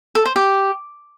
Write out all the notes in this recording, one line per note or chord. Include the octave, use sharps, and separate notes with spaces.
A4
C5
G4